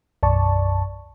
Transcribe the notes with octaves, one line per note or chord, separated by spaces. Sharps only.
B1 F#2 D5 A5 C#6